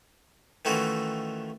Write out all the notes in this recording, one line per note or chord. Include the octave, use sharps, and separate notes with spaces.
D#3 E3 A3 C#4 F4 F#4